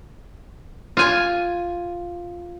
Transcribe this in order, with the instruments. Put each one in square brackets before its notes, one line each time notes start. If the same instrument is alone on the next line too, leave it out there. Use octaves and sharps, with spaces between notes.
[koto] F4 G#5